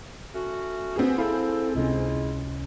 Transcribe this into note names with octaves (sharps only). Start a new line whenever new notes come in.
A3 C#4 F#4
B3 C4 G#4
E4 A4 F5
C#2 C3 G#3 C#4 E4 F4